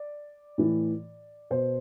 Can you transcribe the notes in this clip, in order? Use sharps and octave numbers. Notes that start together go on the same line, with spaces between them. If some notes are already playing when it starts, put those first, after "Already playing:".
Already playing: D5
A2 E3
B2 C5